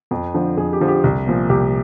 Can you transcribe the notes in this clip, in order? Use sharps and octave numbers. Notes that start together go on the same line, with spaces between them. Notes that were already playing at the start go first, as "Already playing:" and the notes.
F2
D3 F3
F2 G#4
G4
D3 F3
G4
C2
A#2 F3
C2 G4